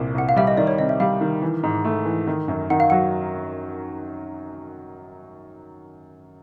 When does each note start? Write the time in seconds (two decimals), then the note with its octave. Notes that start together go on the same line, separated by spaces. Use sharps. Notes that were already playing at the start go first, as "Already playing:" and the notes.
Already playing: C2 A#2 C4
0.15 C2 F#5
0.29 F5
0.36 G3 E5
0.47 D#5
0.57 D#3 D5
0.67 C#5
0.79 C3 D#5
0.89 E5
1.00 G3 F5
1.21 D#3
1.42 E3
1.63 G#2
1.85 A3
2.05 E3
2.27 D#3
2.48 F#2
2.70 D#3 F#5
2.80 F5
2.90 F#3 F#5